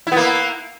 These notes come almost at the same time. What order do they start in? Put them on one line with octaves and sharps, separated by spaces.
E4 B3 A#3